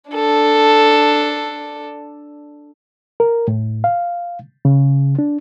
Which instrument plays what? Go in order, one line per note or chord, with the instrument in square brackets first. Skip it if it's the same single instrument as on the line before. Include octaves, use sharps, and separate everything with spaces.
[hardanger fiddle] D4 A4
[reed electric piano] A#4
A2
F5
C#3
D4